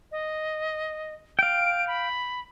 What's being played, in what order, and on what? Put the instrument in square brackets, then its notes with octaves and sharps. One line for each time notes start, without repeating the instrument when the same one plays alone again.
[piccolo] D#5
[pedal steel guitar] F5 G5 [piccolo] D7
[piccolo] B5